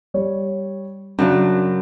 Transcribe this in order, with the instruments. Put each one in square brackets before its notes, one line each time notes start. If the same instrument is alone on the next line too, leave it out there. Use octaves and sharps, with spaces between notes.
[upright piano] G3 C#5
[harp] F#2 C#3 F#3 [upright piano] D4